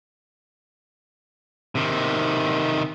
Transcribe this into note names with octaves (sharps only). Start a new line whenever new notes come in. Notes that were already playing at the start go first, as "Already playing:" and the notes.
C3 D#3